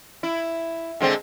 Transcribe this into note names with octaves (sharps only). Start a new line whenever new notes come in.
E4
D3 G#3 C4